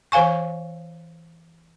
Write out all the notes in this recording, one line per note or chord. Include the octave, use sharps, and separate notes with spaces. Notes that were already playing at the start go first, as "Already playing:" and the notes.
E3 C5 F5 G#5 C#6